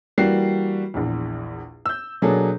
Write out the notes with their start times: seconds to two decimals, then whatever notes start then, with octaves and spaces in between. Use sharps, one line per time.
0.18 E3 G3 A#3 F#4 C7
0.94 A#1 E2
1.86 E6 G6
2.22 B2 F#3 A#3 D4 G#4 A4